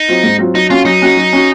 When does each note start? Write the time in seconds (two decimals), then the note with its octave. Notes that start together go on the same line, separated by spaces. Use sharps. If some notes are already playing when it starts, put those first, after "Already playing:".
Already playing: D#4
0.08 F#3 C4 F4
0.23 G#2
0.39 F#3 C4 F4
0.54 F#3 D#4
0.70 C#4 F4 F#4
0.85 F#3 D#4
1.02 C#4 F#4
1.17 F#3
1.33 C#4 F#4